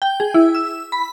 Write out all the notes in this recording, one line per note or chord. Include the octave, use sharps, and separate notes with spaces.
G5
G#4
E4
E6
B5